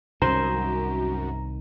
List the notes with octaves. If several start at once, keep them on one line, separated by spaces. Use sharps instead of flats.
C2 F#2 D#3 C5 A#5